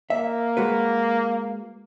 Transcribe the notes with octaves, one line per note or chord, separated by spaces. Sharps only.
A#3 E5
G#3 F#4 B4